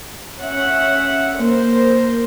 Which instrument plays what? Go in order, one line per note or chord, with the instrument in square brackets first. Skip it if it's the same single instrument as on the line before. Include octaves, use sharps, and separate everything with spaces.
[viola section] C#4 E5 F#5
[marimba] A#3 [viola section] A#4 C5